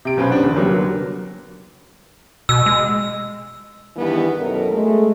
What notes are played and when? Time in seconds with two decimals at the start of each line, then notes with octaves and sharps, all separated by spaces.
0.05 C3 D7
0.17 B1 B3 C#4 B4 C5
0.31 D4 F#5
0.43 E2 D3
0.56 F#3 G3 A#3 B3
0.71 D3 F#3
2.49 B2 E6
2.66 G#3
3.96 E2 G2 D#3 E3 G3 B3
4.40 F#2 B2 A4 A#4
4.72 G#3 A3